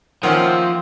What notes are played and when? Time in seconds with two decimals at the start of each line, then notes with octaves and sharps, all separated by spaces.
0.23 D#3 F3 A3 A#3 C4 C#4 F#5